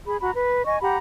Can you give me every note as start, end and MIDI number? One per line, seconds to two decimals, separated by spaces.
0.07 0.17 68
0.07 0.17 83
0.21 0.31 66
0.21 0.31 82
0.21 0.31 83
0.35 0.65 71
0.66 0.78 75
0.66 0.78 80
0.66 0.78 85
0.81 0.98 67
0.81 0.98 78
0.81 0.98 82
0.81 0.98 83